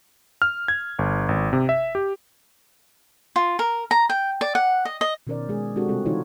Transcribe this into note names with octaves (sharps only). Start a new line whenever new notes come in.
F6
G#6
G1
G#1
C3
E5
G4
F4
A#4
A#5
G5
D5
F#5
D#5
D#5
B2 D#3 C#4 A#4 C5 D5
G#3 G#4
G#3 C4 D4 F#4 G4 A4
C3 G3 C4 F4 A4
D3 E3 D#4 F4 F#4 C#5